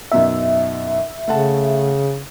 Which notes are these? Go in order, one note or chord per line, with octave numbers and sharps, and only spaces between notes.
F#2 B2 D#4 E5
C#3 A3 F#5 A5